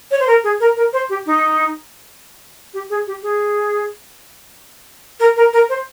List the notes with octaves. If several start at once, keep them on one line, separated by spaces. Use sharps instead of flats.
C#5
C5
A#4
G#4
A#4
A#4
C5
G4
D#4
G4
G#4
G4
G#4
A#4
A#4
A#4
C5